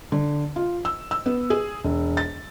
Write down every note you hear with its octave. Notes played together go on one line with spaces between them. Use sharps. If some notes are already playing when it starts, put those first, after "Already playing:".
D3
F4
E6
E6
B3
G#4
E1
A6